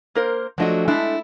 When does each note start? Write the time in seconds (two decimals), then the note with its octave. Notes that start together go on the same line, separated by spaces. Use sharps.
0.15 A#3 A#4 C5
0.58 F3 F#3 A3 D4 F#4 D#5
0.88 G#3 A3 D4 E4